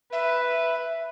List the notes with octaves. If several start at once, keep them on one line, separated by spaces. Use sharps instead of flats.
B4 E5